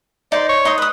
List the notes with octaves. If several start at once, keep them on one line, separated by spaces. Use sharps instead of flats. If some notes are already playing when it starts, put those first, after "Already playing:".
D#4 C5 D5
C#5
D#4 C6 D#6
B4 D#6